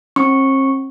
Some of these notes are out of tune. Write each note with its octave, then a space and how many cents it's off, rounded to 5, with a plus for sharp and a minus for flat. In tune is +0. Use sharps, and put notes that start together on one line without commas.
C4 +45 C#6 -5